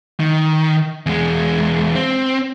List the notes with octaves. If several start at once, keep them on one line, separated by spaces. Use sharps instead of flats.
D#3
E2 G#3
C4